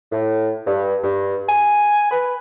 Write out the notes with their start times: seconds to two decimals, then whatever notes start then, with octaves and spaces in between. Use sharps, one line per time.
0.12 A2
0.67 G2
1.04 G2
1.48 G#5
2.11 B4